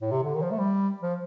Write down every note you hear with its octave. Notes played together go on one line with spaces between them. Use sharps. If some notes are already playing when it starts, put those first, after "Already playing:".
A2
C3
D3
D#3
F3
A3
G3
F3